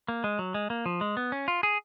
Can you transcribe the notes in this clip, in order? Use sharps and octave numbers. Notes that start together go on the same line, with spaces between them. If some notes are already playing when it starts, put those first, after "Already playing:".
A#3
G#3
F#3
G#3
A#3
F3
G#3
B3
C#4
F4
G#4